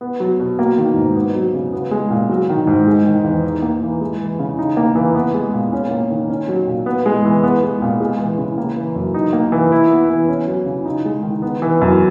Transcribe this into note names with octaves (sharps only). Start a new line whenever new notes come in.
B3
F#3
B2
A#3
D#3
G#2
B3
F#3
C#3
B3
G#3
A#2
F#3
D#3
G#2
G#3
D#3
E2
D#4
A#3
E3
G#3
E3
C#3
D#4
A#3
E3
B3
G#3
A#2
C#4
A#3
D#3
C#4
F#3
A#2
B3
G#3
E3
B3
G#3
A#2
G#3
E3
C#3
A#3
E3
F#2
D#4
A#3
E3
E4
B3
E3
C#4
F#3
C#3
D#4
G#3
D#3
B3
E3
F#2